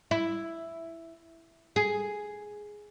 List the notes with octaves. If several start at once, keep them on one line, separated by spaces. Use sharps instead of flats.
E4
G#4